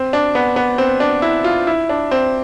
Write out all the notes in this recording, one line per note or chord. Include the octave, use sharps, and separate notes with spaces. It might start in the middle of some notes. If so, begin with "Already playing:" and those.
Already playing: C4
D4
B3
B3
C4
D4
E4
F4
E4
D4
C4